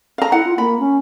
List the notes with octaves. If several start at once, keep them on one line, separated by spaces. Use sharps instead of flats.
F5 A#5
E4 F#5
F4
A#3 B5
C#4